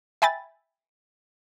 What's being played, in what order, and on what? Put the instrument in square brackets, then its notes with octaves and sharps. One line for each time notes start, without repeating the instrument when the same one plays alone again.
[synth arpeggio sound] E5 G5 G#5 B5 A6